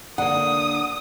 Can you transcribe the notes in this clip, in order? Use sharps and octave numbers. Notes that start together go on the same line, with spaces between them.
D3 A#3 F#5 D#6